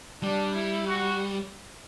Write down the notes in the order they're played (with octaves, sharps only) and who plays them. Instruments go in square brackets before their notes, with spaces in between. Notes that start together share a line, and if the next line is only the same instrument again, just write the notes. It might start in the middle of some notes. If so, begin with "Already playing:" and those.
[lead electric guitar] G3 [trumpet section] D4
[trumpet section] E4
F#4